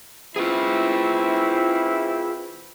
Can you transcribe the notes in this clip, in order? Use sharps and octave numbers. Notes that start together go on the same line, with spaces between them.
E3 C4 E4 F4 G#4